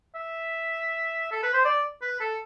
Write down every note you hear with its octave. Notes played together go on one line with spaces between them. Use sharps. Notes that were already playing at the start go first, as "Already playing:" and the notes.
E5
A4
B4
C5
D5
B4
A4